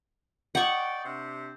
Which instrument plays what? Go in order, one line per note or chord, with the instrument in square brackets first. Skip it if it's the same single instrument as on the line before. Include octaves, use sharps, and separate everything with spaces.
[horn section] D5 D#5 G5 [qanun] F#5 C#6
[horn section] C3 D4 G4